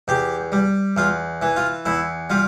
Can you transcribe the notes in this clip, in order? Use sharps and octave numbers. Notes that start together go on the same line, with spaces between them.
E2 G4
G3
E2 F4
E3
F4
E2 E4
G3 F4